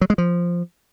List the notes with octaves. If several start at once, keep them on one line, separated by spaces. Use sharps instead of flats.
F#3
G#3
F3